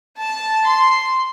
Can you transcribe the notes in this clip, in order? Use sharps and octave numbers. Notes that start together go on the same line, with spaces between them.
A5
C6